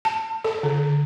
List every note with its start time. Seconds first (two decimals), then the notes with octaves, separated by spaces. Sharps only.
0.05 A5
0.44 A4
0.63 D3